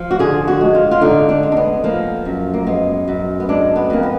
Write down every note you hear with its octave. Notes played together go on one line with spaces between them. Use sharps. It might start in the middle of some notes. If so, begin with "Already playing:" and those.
Already playing: F3
F#4
D3 G#4
F#4
G#3
F4
F4
D3 D#4
D4
G#3
D4
B3
F3 A#3
F#2
A#3
G#3 B3
F#2
B3
G#3 D4
B3
F2 A#3
B3